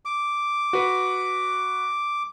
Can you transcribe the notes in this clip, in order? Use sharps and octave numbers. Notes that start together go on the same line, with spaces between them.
D6
F#4 B4